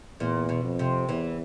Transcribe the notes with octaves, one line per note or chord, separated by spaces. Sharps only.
E2 A#2
B2
F2
C3
E2 E3